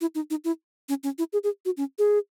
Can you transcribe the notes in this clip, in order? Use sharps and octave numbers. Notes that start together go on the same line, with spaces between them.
E4
D#4
D#4
E4
C#4
C#4
E4
G#4
G#4
F#4
C#4
G#4